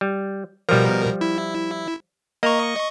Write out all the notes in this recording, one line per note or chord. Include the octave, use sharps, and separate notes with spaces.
G3
B2 F3 G3 A#4
E4
A#3 D#5 A#5 C#6